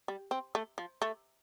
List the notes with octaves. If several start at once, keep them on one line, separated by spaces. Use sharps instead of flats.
G3
C4
A3
F3
A3